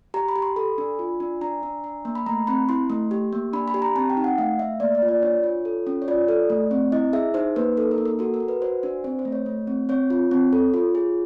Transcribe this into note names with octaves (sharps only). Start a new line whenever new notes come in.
G4 A#5
B5
G4
C6
A4 B5
D4
F4
D4
D4 A#5
D4
D4
A#3
B5
A3 A#5
C4 B5
E4 C6
A3
G4
A#3
D4 B5
B5
G4
A#5
C4 A5
G5
D#4
F#5
A3 F5
A3 E5
A#3 D5
D5
F4
D5
D4 C#5
F4
A4
C#4
C#5
F4 D5
A4
A3
C4
E4 D#5
G#4 E5
D#4 C5
A#3 B4
D#4 A4
A#4
A#3
A#4
F#4 A4
A#4
F#4
B4
F#4 C5
D4 C5
C4 C5
C5
A3
C#5
A3
C4
C4 C#5
F4
C4
A4
F4
G#4